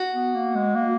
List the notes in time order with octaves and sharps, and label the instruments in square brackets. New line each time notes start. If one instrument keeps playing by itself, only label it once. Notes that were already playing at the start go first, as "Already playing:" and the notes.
Already playing: [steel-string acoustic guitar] F#4
[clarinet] B3
A#3
G#3
A#3